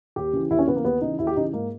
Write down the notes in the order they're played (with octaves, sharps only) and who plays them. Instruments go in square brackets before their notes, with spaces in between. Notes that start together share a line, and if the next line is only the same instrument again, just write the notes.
[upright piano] D#2 G4
C#3 E3
D#2 E4
C#4
C#3 E3 B3
A#3
D#2 B3
C#3 E3 D#4
D#2 E4
G4
C#3 E3 D#4
G#2 A#3